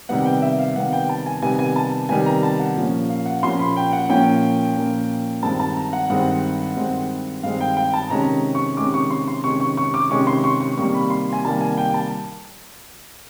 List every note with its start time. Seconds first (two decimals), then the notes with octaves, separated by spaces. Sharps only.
0.09 C3 D#3 G3 B3 F#5
0.26 G5
0.42 E5
0.59 F5
0.76 C3 D#3 G3 B3 F#5
0.93 G5
1.09 A5
1.26 G#5
1.42 C3 D#3 G3 B3 G#5
1.59 G#5
1.76 A5
2.09 C3 D#3 G3 B3 G#5
2.26 A#5
2.43 A5
2.59 F#5
2.76 A#2 F3 A#3 C#4
3.09 F5
3.26 F#5
3.43 A#2 F3 A#3 C#4 C6
3.59 B5
3.76 G5
3.93 F#5
4.09 A#2 F3 A#3 C#4 G5
4.76 A#2 F3 A#3 C#4
5.43 G2 D#3 G#3 C4 A5
5.60 A5
5.76 A#5
5.93 F#5
6.10 G2 D#3 G#3 C4 F#5
6.77 G2 D#3 G#3 C4
7.43 G2 D#3 G#3 C4 F5
7.61 G5
7.77 G5
7.94 A5
8.10 C3 D#3 G#3 C#4 A#5
8.55 C#6
8.77 C3 D#3 G#3 C#4 D6
8.94 C#6
9.10 C6
9.28 C6
9.43 C3 D#3 G#3 C#4 C#6
9.60 C#6
9.77 C#6
9.94 D6
10.11 C3 D#3 G#3 C#4 C#6
10.27 C6
10.44 C#6
10.61 C#6
10.77 C3 D#3 G3 A#3 C#6
10.94 B5
11.10 C6
11.33 G#5
11.44 C3 D#3 G3 A#3 A5
11.61 G#5
11.77 G5
11.94 A5